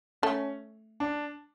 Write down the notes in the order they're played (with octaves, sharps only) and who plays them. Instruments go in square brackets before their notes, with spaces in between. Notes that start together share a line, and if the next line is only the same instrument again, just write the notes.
[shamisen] A3 [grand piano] C#4
[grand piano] D4